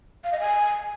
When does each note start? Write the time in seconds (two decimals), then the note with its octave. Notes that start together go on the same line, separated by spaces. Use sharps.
0.24 F5
0.32 D#5
0.40 G#5